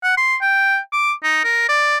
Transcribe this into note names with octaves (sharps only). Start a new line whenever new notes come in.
F#5
C6
G5
D6
D#4
A#4
D5